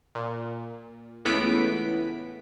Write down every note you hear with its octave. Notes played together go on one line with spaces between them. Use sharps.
A#2
C#2 A2 E3 B3 B6 D7